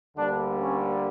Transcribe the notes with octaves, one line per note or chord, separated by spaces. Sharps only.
D2 D3 G3 A#3 D4
C#4